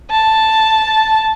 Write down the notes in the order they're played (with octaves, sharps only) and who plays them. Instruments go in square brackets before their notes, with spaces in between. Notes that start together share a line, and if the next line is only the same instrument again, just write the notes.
[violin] A5